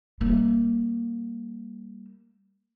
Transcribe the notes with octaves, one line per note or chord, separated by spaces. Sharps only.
G3 A#3